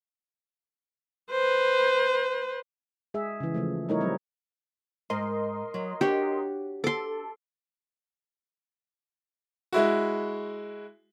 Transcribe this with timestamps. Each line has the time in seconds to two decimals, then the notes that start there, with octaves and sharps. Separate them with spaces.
1.31 B4 C5
3.14 G#3 G#4 E5
3.40 C#3 E3
3.54 C#3 F3 A3
3.89 G3 A3 D#4 E4 A#4 C#5
4.01 F#3 G3 C4
5.10 G#2 A#4 D#5 C6
5.74 F#3
6.01 D4 F#4 G4 C#5
6.84 A4 C6 D6
9.73 G#3 E4 F#4